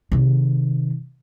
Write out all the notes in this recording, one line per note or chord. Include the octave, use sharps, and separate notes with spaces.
C3 D#3